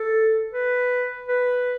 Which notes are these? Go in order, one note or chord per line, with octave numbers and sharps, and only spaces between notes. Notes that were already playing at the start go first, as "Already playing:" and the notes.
Already playing: A4
B4
B4